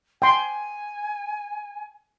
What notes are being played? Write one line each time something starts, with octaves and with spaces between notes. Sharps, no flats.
G5 G#5 C6